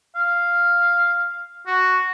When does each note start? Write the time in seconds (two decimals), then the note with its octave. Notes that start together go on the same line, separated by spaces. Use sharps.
0.16 F5
1.67 F#4